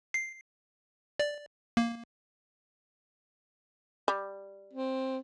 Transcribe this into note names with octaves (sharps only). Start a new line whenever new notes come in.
C7
D5
A#3
G3
C4